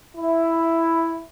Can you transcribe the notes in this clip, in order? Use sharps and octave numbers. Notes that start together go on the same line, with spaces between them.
E4